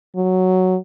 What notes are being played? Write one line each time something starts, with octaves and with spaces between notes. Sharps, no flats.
F#3